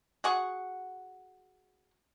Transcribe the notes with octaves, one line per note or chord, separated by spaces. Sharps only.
F#4 G#4 F#5 C#6